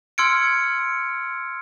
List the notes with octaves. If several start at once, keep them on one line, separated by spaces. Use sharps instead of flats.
C6 E6 F6 G#6 C#7 D7